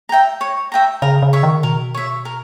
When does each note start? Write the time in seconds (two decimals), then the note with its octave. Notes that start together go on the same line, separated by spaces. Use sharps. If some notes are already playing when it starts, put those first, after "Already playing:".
0.09 E5 G5 A#5
0.41 C#5
0.72 E5 G5 A#5
1.02 C#3 A#4
1.22 C#3
1.33 C#5 E5
1.43 D#3
1.63 B2 A#4
1.94 C#5 E5
2.25 A#4